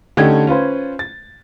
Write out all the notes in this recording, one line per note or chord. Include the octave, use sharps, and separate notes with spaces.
D3 A3 C#4 D#4 G4 G#6
C#4 F4 B4 C5
A6